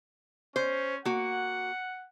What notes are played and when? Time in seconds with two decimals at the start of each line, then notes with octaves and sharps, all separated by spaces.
0.56 C#4 C5
1.05 A#3 F#4 F#5